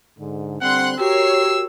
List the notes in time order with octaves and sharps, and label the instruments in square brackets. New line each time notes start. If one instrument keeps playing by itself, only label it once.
[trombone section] G#2 D3
[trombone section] D3 G3 C4 [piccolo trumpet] F#5 [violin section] C6 F#6
[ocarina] F#4 [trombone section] G4 [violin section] A#4 C#5 C7 [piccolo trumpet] E6